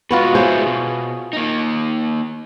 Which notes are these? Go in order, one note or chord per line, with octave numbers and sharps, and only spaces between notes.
B2 G#3 B3 F4 F#4 B4
G#2 B3 E4 G#4 C5 C#5
B2
A#3 D#4